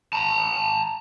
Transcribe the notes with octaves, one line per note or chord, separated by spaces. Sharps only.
A5 A#5